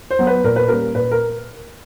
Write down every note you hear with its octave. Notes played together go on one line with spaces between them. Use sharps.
C5
F#3 B3
B4
A#2 A#4
B4
G3 A#3 C#4 A#4
A#2 B4
A#4